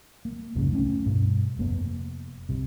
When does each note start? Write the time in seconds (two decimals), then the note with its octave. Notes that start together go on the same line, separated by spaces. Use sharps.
0.25 A#3
0.55 C2 F2 G#2 C#3
0.72 A3 C4 C#4
1.06 G2 B2
1.58 F1 A#3 B3
2.49 C2 C3